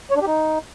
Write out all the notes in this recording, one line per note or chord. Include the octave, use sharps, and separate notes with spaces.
C#5
D4
G4
D#4